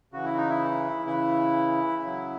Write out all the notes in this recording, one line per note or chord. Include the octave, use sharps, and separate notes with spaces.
C#3 E3 F#4
E4
D#4
E4
C#3 E3 E4
C#3 F#3